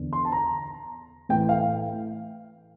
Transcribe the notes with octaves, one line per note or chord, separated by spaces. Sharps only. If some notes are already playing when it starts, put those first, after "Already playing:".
Already playing: E2 D3
C6
A5
A#5
A2 E3 G5
F5